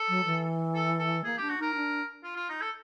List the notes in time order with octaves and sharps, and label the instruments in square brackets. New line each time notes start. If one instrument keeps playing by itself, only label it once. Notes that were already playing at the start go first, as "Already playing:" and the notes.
Already playing: [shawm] A4
[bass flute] F#3
E3
[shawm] A4
A4
[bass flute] A#3 [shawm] G#4
[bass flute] D4 [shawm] G4
[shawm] F#4
[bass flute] D#4 [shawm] A#4
[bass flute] D4
[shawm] F4
F4
D#4
A4